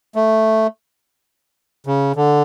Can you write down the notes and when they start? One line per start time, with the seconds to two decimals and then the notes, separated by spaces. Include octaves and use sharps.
0.16 A3
1.86 C#3
2.16 D3